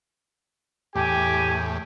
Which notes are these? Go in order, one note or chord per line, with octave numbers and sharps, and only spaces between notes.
E2 A2 G4 G#5